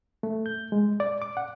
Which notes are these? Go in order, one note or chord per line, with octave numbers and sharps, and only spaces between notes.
A3
G6
G#3
D5
D6
F#5